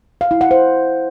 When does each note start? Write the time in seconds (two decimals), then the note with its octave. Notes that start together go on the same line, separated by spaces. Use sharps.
0.21 F5
0.31 E4
0.41 F#5
0.51 C5